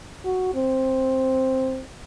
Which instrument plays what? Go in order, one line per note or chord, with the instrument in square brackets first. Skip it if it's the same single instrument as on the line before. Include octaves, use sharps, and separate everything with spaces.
[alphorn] F#4
C4